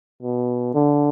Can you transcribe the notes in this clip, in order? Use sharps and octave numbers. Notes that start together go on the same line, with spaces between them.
B2
D3